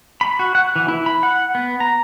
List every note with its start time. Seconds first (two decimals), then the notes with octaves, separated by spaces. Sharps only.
0.21 B5
0.39 F#4
0.55 F#5
0.76 E3
0.88 E4
1.06 B5
1.23 F#5
1.55 B3
1.80 A#5